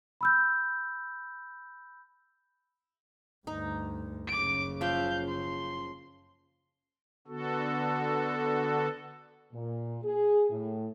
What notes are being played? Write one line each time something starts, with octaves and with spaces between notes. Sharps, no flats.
B5 E6 G6
D2 G2 D#4
F#1 C#3 D6 D7
F3 E5 F5 G6
C6
D3 B3 F#4 A4
A#2
G#4
A2